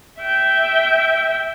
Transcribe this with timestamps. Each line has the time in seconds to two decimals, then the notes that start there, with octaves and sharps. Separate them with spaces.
0.21 E5 G5